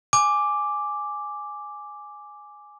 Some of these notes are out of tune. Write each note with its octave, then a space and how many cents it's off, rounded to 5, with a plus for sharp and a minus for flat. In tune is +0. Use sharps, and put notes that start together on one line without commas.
G#5 +0 D6 +0